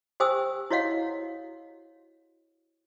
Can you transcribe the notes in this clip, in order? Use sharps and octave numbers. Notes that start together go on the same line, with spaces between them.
G4 C5 G5 G#5 D#6 E6
E4 F#4 C#5 D#5 F5 F#5